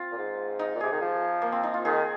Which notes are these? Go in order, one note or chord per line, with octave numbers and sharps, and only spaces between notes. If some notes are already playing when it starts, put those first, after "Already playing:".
Already playing: C4 F4
A#2
G#2
D#4
A#2
C3 G#4
D#3
F3
A#3
C4
D#4
F4
D#3 G#4